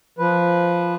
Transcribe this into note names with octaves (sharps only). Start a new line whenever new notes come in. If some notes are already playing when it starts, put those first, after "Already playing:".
F3 B4